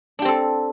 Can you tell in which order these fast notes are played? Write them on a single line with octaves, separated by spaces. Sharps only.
D4 G4 C4 A4